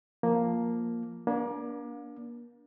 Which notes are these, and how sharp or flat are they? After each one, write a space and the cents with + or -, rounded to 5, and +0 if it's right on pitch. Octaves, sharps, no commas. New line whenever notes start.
F3 +0 A#3 +0
A#3 +35 D4 -20